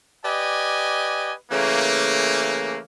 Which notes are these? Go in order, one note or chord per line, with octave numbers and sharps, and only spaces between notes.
G4 B4 D5 D#5 G#5
C#3 E3 A3 A#3